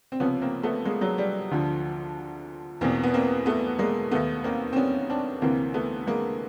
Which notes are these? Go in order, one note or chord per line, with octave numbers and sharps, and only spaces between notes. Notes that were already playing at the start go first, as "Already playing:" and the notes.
C4
C#2 C3 F3 B3 C#4
A#3 C4
A3 B3
G#3 A#3
F#3 G#3
G3
D2 D3 F3
E2 B2 A#3 C4
B3
A#3 C4
A3 B3
G#3 A#3
D#2 D#3 A3 B3
A#3 C4
C4
B3 C#4
C4 D4
D2 C3 E3 A#3 C4
A3 B3
G#3 A#3